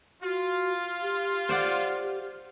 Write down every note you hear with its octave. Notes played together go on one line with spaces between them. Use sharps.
F4 F#4
G4
C5 D5 F#5